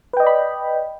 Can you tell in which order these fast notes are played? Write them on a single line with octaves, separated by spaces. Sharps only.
B4 G5 D#5 D5 B5